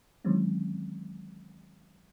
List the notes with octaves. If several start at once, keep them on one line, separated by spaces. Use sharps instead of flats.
D#3 E3 F#3 G#3 C4 C#4